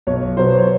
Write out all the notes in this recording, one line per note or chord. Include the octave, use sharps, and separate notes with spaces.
B1 C#5
B2 F#3 C5
C#5